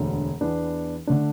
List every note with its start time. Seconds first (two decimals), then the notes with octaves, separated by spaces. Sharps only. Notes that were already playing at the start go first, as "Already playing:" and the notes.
Already playing: E1 D2 D3
0.41 E2 E3 B3 D4
1.07 D3 A3 D4